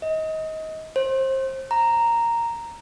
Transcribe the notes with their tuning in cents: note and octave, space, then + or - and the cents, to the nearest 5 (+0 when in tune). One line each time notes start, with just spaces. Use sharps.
D#5 +25
C5 +25
A#5 -5